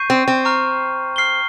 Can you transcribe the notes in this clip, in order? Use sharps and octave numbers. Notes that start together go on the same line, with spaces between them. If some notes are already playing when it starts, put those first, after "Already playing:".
Already playing: C#6 G6 C7 D#7
C4
C4
A#5 C#6 F6
F6 C7 G7